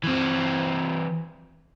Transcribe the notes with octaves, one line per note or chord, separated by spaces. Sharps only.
E3 C4